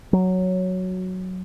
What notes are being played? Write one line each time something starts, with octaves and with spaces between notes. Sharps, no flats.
F#3